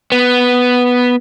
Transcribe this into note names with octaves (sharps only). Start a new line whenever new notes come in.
B3